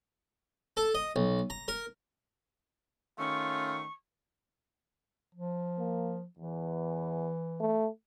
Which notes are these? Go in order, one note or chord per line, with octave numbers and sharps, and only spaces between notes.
A4
D#5
B1
A#5
A#4
D#3 A3 C#4 F4 C#6
F3
A#3
E2 E3
A3